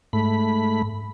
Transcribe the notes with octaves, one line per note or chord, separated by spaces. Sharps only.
G#2 A3 B5